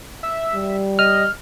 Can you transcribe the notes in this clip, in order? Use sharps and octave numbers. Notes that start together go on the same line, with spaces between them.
E5
G3
D#5 F6